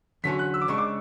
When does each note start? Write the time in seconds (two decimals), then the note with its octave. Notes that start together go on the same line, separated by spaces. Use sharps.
0.24 E2 D3 F#3 C#4 F#4 B6
0.39 F#6
0.54 E6
0.62 D6
0.68 C#3 G#3 D4 C#6
0.78 D6